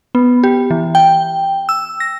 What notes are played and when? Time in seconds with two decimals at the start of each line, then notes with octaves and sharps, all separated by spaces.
0.15 B3
0.44 G4
0.70 E3
0.95 G5
1.69 E6
2.00 A#6